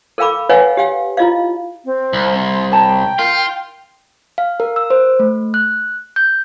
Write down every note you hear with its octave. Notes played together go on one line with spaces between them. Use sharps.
A4 A#4 F5 G5 B5 D6
B4 C#5 D#5 F5 F#5 G#5
G4 F5 G5
E4 F4 D#5 F5
C4
C2
C6
C#5 G5 A5 A#5
F4 A#4
F5
A#4
E6
C5
A3
F#6
G6